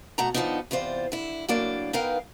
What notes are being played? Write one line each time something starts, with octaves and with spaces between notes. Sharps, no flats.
B2 A3 F#5 A#5
D#3 F3 F#3 B3 D4 D#4
E2 C3 F4 C5 D5
D3 E4
A2 F#3 A#3 D4 D5
B3 D#4 A#4 B4 F5 G5